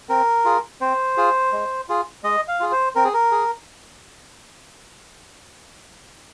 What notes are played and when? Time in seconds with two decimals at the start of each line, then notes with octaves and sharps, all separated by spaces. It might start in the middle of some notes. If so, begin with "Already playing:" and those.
0.09 C4 A#4
0.45 F4 G#4
0.81 C4 C5
1.17 F4 G#4
1.52 G#3
1.89 F4 G#4
2.24 G#3 D#5
2.48 F5
2.60 F4 G#4
2.72 C5
2.95 C4 A#4
3.04 G#4
3.14 A#4
3.31 G#4